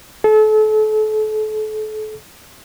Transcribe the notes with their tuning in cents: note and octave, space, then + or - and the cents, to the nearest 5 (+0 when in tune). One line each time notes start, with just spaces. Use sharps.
A4 -35